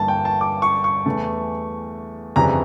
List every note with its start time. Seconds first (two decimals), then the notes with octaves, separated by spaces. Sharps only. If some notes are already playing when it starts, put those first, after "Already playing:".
Already playing: G1 G2 E3 A#3 A5
0.08 G5
0.25 A5
0.41 D6
0.62 C#6
0.84 C#6
1.06 E2 E3 A3
2.36 G1 F2 C#3 E3 G3 A#5